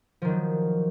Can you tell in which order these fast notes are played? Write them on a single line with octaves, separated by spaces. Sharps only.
F3 D#3 F#3